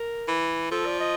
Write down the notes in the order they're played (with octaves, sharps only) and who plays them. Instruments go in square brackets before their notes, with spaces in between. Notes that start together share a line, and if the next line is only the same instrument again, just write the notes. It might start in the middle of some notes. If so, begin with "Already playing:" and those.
Already playing: [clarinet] A#4
[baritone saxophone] E3
[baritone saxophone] F3 [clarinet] A4
[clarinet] D5
D#5